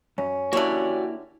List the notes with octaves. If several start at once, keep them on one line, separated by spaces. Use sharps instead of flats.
F#2 C#4
D3 A#3 E4 F#4 G4 C#5 D5